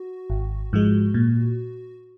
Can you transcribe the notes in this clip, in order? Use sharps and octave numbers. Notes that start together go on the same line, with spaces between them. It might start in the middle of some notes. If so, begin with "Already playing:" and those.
Already playing: F#4
G#1
G#2 F3 G#3
A#2